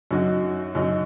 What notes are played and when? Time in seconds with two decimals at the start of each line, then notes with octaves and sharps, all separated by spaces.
0.11 F#2 F#3 D#4 F#4
0.75 F#2 F#3 D#4 F#4